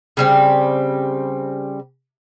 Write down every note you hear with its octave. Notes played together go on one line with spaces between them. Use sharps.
C#3 G3 C4